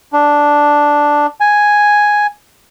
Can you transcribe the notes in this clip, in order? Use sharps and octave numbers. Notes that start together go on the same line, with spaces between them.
D4
G#5